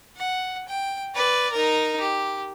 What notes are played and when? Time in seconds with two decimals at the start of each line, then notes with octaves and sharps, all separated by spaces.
0.17 F#5
0.68 G5
1.15 B4 D5
1.52 D#4 A#4
2.00 G4